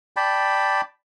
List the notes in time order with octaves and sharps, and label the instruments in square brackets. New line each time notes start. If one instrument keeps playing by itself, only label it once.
[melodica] D5 G5 A5 B5